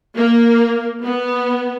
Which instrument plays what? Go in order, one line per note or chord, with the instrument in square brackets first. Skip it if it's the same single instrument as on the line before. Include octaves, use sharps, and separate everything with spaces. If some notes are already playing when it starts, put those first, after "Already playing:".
[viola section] A#3
B3